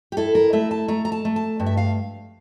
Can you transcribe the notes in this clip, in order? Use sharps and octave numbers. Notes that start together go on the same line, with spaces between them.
G4
E4 A4
A#4
A3 E5
A5
A3 A#5
A#5
A5
A3
A5
G2
E5
F5